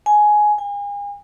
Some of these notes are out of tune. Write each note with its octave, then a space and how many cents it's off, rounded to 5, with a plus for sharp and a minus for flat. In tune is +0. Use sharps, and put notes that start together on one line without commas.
G#5 +10
G#5 -40